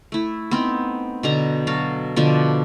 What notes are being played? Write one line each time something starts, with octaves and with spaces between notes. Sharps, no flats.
A3 E4
B3 C4 D#4
B2 D3 A#5
F#3 F#4 A4 F5
B2 D3 F3 D4